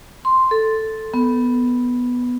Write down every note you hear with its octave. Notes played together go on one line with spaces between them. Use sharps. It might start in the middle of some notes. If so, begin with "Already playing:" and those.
C6
A4
B3